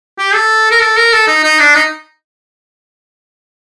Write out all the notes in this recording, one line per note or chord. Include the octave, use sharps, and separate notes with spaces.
G4
A4
A#4
A4
A#4
A4
D#4
D#4
D4
D#4